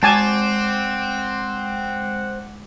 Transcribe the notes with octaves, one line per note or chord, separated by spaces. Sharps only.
G#3 C4 F#5 G#5 A5 D6 E7